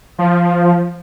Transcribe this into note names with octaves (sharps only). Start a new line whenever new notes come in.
F3